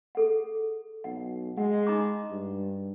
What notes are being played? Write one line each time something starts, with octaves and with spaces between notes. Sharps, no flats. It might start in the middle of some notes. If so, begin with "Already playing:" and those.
G#4 A4 F#5
B1 F#5
G#3 F#5
D#4 A#5 D6
G2